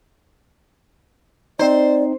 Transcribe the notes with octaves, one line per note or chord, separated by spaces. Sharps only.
C4 D#4 C5 D5